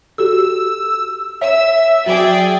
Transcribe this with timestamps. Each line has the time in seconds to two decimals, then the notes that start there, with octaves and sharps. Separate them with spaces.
0.18 F#4 G4 A4 E6
1.41 C#5 E5 E6
2.06 F#3 F#4 G#4 D5 G5